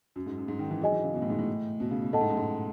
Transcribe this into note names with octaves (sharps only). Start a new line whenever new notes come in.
F#2
G#2
F#2
G#2
D#3
E3
F#3 D#4 G#4 D#5 G#5
E3
C#3
B2
A2
G#2
A2
B2
C#3
B2
A2 A4 D#5 F#5 A5
G#2
F#2
G#2